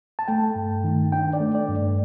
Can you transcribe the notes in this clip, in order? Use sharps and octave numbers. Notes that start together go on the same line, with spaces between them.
A5
A3 G5
G2
D#3
D4 G5
D5
A3
D5
G2